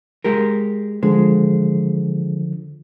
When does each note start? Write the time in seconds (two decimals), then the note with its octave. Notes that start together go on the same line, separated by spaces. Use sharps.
0.24 G#3 G4 A#4
1.03 D3 F3 G#3